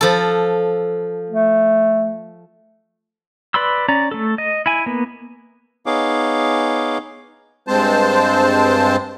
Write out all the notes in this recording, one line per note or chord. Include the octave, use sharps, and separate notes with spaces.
F3 A4
A3
B4 D5 B5 C6 E6
C#4 D5 A#5
A3 A4
D#5
E4 G#5
A#3 B3
B3 D#4 G#4 C#5 F5 D6
G2 G#3 C4 C5 A5